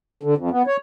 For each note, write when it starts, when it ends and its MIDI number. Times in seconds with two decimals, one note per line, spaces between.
0.23 0.35 50
0.37 0.49 41
0.51 0.62 59
0.67 0.77 73